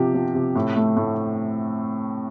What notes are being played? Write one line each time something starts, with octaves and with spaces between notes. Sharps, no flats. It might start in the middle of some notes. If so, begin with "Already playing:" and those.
Already playing: C3 F3 G4
F3
C3
A2
A3
A2